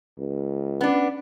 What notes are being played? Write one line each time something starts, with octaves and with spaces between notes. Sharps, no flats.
C#2
B3 C#4 D4